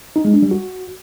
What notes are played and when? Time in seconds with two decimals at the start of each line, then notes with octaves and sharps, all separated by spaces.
0.16 D#4
0.25 G#3
0.34 D4
0.42 G3
0.51 F#4